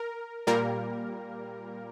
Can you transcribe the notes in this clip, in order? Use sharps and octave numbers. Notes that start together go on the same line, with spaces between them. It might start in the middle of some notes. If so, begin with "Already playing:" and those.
Already playing: A#4
A#2 G3 A#3 A#4